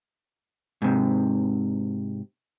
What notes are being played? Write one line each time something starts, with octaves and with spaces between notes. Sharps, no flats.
G#2 C3